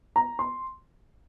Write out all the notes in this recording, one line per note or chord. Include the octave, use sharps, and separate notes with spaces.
A#5
C6